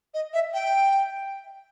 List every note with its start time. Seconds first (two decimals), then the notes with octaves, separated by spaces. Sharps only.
0.14 D#5
0.33 E5
0.54 G5